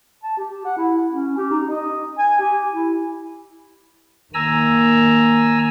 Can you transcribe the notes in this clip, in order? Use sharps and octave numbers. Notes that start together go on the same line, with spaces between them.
A5
G4
F#5
E4
C#4
G4
D#4
D#5
G#5
G4
E4
D#3 A#3 G#5 A#5 E6